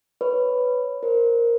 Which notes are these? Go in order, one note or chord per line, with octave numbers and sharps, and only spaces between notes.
B4 C#5
A#4 C5